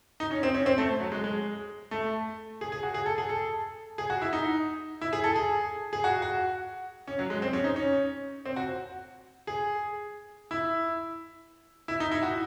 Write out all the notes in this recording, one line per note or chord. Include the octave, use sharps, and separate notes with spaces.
D#4
C#4
C4
C#4
C4
A3
F#3
G#3
G#3
A3
G#4
G#4
F#4
G#4
A4
G#4
A4
G#4
F#4
E4
D#4
E4
G#4
A4
G#4
G#4
F#4
F#4
C#4
F#3
G#3
C4
C#4
D#4
C#4
C4
F#4
G#4
E4
E4
D#4
E4
F#4